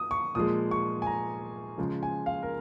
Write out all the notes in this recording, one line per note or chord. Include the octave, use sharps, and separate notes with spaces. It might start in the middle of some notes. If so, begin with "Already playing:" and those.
Already playing: D#6
C#6
A#2 F3 G#3 D#6
C#6
G#5
A#5
C#3 F3 G#3
G#5
F5
A#4